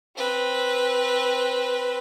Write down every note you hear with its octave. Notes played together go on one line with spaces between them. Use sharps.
C4 B4